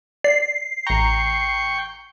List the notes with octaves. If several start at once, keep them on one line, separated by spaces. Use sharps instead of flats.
D5 C7
A1 G5 A#5 C#6